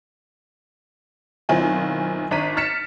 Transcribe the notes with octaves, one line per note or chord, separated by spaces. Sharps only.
B1 D#3 C4 E4 F4 G#5
G#1 D4 A#5 C#6 B6 D#7
F6 A6 B6 C#7 E7